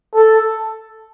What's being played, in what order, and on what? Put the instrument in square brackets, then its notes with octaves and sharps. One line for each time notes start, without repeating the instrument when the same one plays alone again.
[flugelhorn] A4